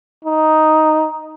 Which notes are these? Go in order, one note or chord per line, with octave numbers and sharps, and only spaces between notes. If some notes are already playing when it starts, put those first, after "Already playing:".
D#4